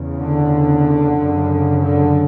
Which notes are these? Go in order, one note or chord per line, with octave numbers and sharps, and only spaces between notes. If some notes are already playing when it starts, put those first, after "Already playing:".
Already playing: E2 C#3
D3
F#2 C#3
D3